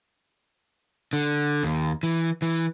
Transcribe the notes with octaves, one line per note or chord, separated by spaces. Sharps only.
D3
D#2
E3
E3